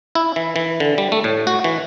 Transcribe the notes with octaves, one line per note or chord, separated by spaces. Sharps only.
E4
E3
E3
D3
G3
A3
A2
F#4
E3